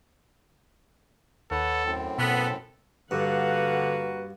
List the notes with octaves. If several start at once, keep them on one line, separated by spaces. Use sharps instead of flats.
D#2 A4 B4 C#5 F#5
F#2 A2 C4
B2 B3 A4
G2 D3 A#3 F#4 B4 F5 F#5